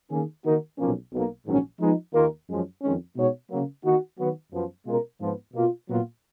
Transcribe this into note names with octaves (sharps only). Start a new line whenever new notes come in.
D#3 A#3 C#4 G#4
D#3 A#3 D#4 F#4 A#4
B1 A#2 F3 A#3 C#4
B1 B2 A#3
A#1 G#2 D#3 F#3 C#4
F3 G#3 B3 D#4
D#2 D#3 A#3 F4 A#4
F#2 F3 G#3 C#4
F2 D#3 G#3 C#4
B2 G#3 D#4 F#4 C#5
C#3 F#3 A#3
D#3 A#3 D#4 F#4
D#3 F#3 B3 F#4 B4
F#2 F3 B3
B2 G#3 C#4 F4 A#4
G#2 F3 B3
B2 A#3 F4
A#2 F#3 B3 F4